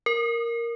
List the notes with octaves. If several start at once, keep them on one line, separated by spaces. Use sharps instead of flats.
A#4